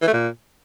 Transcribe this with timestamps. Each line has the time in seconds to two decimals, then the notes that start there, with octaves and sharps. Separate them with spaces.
0.02 E3
0.07 A3
0.13 A#2